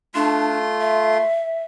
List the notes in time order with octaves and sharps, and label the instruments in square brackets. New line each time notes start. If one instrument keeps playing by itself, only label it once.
[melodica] A3 F4 C6 [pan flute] D4
[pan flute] E5